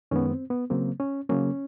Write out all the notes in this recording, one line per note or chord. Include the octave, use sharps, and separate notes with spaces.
F#2 D#3 G#3 B3 C#4
C4
B3
C#3 F#3 A#3 C4
C#4
C#3 F#3 A#3 C#4